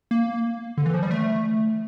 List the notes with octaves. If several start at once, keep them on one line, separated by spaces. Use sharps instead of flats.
A#3
D3
E3
F3
G3
A3